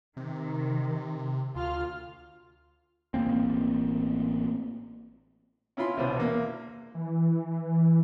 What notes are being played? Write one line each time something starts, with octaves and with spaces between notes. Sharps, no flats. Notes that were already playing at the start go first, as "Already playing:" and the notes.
C3 D#3
D2 F4 F6
A1 D#3 A#3 C4
C#4 E4 F4 B5 C6
C2 B2 C#4 D4 B4 C5
E2 A#3
E3